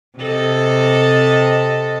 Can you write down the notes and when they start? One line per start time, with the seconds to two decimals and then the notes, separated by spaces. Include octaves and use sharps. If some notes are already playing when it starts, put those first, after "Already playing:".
0.19 C3 A4 D#5